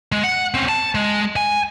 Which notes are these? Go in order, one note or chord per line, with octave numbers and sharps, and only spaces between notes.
G#3
F#5
C4 C#4
A5
G#3
G#5